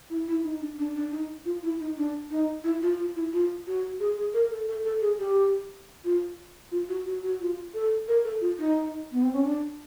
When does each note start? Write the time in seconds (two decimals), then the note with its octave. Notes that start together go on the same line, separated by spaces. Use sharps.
0.10 E4
0.28 E4
0.44 D#4
0.61 D4
0.79 D4
0.96 D4
1.12 D#4
1.45 F4
1.63 E4
1.80 D#4
1.97 D4
2.31 D#4
2.64 E4
2.82 F4
2.99 F4
3.16 E4
3.33 F4
3.67 F#4
4.00 G#4
4.18 G#4
4.34 A#4
4.51 A4
4.68 A4
4.85 A4
5.02 G#4
5.19 G4
6.05 F4
6.72 F4
6.89 F#4
7.06 F#4
7.23 F#4
7.40 F4
7.74 A4
8.08 A#4
8.24 A4
8.41 F4
8.59 D#4
9.12 B3
9.23 C4
9.33 C#4
9.43 D4